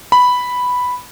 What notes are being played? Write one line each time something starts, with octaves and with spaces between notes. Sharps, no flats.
B5